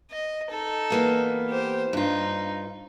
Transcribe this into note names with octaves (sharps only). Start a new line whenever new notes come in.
D#5
D#4 A4
E3 A#3 B3
G4 C5
G2 D#4 F4